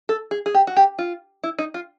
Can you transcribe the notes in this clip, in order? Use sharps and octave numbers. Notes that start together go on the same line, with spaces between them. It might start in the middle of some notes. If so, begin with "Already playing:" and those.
A4
G#4
G#4
G4
F#4
G4
F4
E4
D#4
F4